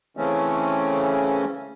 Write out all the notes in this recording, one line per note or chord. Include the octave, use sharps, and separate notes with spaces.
C#3 E3 A3 C4 C#4